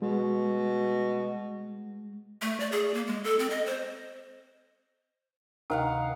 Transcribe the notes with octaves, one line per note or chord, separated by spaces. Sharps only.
B2 G#3
A3
D5
G#4
A#3
G#3
A4
C4
D#5
C5
D2 C3 D#3 F5 F#5